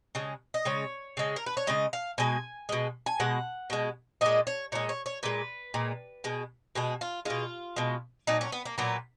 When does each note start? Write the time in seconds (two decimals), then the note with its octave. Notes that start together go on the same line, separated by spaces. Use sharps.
0.15 C#3 G#3
0.54 D#5
0.65 C#3 G#3 C#5
1.17 C#3 G#3
1.36 A#4
1.46 B4
1.57 C#5
1.67 C#3 G#3 D#5
1.93 F5
2.18 B2 G#3 G#5
2.69 B2 G#3
3.06 G#5
3.20 B2 G#3 F#5
3.70 B2 G#3
4.21 A#2 G#3 D#5
4.47 C#5
4.72 A#2 G#3 C#5
4.89 C#5
5.06 C#5
5.23 A#2 G#3 B4
5.74 A#2 G#3
6.24 B2 G#3
6.75 B2 G#3 G#4
7.01 F4
7.25 B2 G#3 F4
7.76 B2 G#3
8.27 A#2 F#3 D#4
8.41 C#4
8.52 B3
8.65 A#3
8.78 A#2 F#3 B3